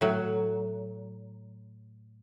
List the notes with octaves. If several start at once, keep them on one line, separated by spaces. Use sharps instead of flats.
A2 F#3